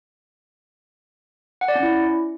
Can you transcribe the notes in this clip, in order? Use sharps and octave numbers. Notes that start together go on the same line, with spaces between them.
F#5
D5
C#4
E4